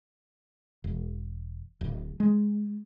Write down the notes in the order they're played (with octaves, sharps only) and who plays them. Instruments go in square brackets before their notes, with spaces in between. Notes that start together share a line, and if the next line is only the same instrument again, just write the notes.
[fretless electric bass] E1
D1
G#3